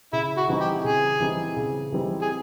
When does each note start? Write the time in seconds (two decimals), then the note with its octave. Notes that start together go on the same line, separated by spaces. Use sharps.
0.13 C#3 E4
0.37 F#4
0.48 E3 G3 C4 D#4
0.60 G4
0.84 C#3 G#4
1.20 E3 G3 C4 D#4
1.57 C#3
1.92 E3 G3 C4 D#4
2.21 G#4